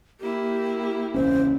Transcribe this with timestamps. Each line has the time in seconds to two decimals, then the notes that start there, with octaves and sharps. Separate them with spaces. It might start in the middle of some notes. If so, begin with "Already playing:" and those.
0.20 A#3 E4 G4
1.14 E1 C#2 C#4 C5